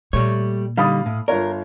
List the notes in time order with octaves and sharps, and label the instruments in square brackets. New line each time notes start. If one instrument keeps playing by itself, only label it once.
[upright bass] A#2 [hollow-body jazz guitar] G3 A3 C#5
[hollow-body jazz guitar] D3 G3 D#4 [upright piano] F5 B5 D#6
[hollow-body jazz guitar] A2
[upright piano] G1 F4 C#5 [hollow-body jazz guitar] A#4